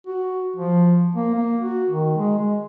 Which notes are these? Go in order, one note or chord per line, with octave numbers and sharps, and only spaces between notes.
F#4
F3
A#3
A#3
F#4
D#3
G#3
G#3